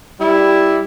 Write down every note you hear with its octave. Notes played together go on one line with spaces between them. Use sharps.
G3 E4